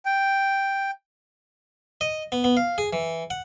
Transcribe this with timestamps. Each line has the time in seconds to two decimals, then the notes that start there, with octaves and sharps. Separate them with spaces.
0.06 G5
2.01 D#5
2.32 B3
2.44 B3
2.57 F5
2.78 G#4
2.93 E3
3.30 F#5